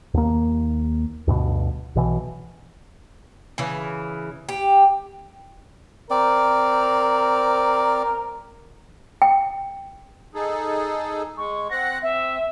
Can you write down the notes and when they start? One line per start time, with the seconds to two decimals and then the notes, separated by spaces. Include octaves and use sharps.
0.14 D#2 A#3
1.27 D2 G2 B2
1.95 B1 B2 E3
3.58 C#3 E3
4.49 G4
6.10 C4 A#4 D5
9.22 G5
10.35 D#4 G#4 A4
11.38 G#3 C#6
11.71 C4 F#5 A#6
12.03 C4 E5